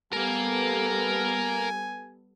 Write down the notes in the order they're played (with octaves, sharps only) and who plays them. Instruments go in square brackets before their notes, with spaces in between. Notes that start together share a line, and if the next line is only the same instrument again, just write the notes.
[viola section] G3 B3 A4 [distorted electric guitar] A#4 F5 [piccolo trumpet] G#5